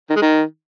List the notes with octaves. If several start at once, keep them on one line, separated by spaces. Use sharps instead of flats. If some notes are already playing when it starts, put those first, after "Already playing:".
D#3
G#3
D#3